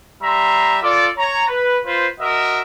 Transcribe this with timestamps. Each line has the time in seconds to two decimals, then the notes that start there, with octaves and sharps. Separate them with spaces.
0.23 G3 E5 A#5 C6
0.82 F4 A4 D5
1.17 C#5 A#5
1.48 B4
1.85 F4 B4 C5
2.20 F#4 A#4 D#5 E5